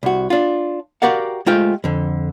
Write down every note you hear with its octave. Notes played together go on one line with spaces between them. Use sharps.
C2 F#4
D4 F4
F#4 G4 A#4 D5 F5 F#5
G#3 A3 F4 G4 C5 G5
F2 D3